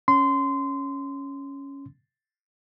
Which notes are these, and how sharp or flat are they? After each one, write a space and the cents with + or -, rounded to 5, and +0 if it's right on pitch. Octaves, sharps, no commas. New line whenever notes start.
C#4 +0 C6 -20